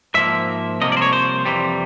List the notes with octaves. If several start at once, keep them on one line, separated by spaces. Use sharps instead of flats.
G#2 F3 A#3 E5
C2 C3 F3 A#3 D#5
D5
C5
C#5
C5
F2 C3 E3 G3